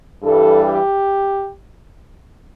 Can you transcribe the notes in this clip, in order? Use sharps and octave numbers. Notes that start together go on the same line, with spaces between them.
G2 E3 G3 A4
G4